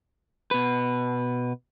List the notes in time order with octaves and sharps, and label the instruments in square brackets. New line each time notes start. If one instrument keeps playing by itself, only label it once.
[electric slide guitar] B2 B4